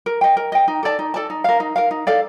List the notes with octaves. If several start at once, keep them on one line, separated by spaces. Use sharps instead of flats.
A#4
D#5 G5
A#4
D#5 G5
D#4
A4 D5 A5
D#4
A4 D5 A5
D#4
A#4 F5
D#4
A#4 F5
D#4
A4 D5 F5